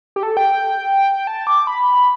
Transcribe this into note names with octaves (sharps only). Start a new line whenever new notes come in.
G4
A4
G5
A5
D6
B5